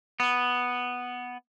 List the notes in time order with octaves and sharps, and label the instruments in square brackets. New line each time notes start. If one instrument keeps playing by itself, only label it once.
[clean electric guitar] B3